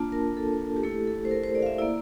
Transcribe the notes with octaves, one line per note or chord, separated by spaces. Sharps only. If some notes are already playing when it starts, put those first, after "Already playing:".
Already playing: A#3 D4 F4 A5
A#4
A4
G4
A3 E4 A4
A4
C5
A#4
C5
D5
F5
E5
A#3 E4 D5